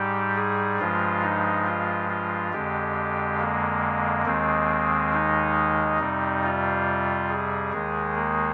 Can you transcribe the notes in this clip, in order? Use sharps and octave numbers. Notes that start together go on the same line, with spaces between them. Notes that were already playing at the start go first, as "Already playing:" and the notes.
Already playing: G#2 G3 G4
G#4
G2 F3 G#3 F4
D#4
F4
F4
F2 D3 G#3 G4
A#3
D#2 D#3 G#3 C4
D#4
F2 C3 G3
F4
G#4
D#2 D#3 G#3
A#3